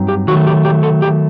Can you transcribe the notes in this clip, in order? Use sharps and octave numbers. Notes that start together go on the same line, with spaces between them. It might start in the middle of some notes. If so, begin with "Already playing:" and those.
Already playing: G2 F#3 C4 D#4
G4
D#3 F#3 A3 F#4
G4
G4
A4
G4